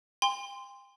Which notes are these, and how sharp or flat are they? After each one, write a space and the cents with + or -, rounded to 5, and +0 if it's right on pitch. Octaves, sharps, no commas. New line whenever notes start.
G5 +40 C6 -10